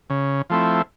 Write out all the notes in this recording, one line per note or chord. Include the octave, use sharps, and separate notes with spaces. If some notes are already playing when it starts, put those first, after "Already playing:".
C#3
F3 A3 C4 E4